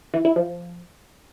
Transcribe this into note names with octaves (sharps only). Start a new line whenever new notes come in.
E3
E4
F3